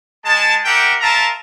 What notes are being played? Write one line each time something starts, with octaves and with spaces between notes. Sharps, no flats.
G#3 A5
G4 A#4 E5 F#5 G5
F4 A#4 E5 A5 A#5